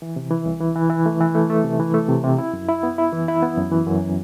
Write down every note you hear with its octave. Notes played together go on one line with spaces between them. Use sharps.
E3
C3
E3
C2
E3
E3
E3
A3
E3
A3
A3
C3
E3
A3
C3
C3
E4
F#2
E4
B3
E4
E3
E4
B3
F#2
E3
F#2